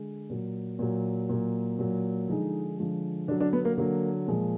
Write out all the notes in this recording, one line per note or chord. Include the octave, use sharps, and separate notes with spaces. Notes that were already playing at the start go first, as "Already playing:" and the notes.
Already playing: D3 G#3
A#2 F#3
A#2 F#3
A#2 F#3
A#2 F#3
D3 F3 G#3 D#4
D3 F3 G#3
D3 F#3 D4
D4
B3
A#3
D3 F#3 A#3
A#2 F3 G#3